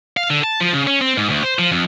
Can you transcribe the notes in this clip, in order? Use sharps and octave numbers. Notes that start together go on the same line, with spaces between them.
F5
D3
A5
F3
C#3
C#4
C4
G#2
D2
C5
F3
F2